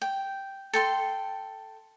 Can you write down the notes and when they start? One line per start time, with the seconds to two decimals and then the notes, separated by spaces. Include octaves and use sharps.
0.02 G5
0.73 A4 G5 C6